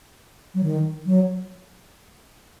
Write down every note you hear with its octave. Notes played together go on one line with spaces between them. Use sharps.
F#3
D#3
F#3